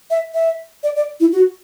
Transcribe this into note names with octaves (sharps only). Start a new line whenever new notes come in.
E5
E5
D5
D5
E4
F#4